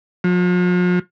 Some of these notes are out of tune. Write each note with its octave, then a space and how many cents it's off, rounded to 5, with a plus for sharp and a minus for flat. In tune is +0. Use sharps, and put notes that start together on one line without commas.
F3 +45